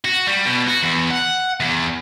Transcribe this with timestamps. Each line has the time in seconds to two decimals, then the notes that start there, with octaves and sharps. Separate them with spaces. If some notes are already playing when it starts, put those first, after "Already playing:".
0.05 F#4
0.27 G3
0.46 B2
0.68 F#4
0.83 E2
1.11 F#5
1.61 E2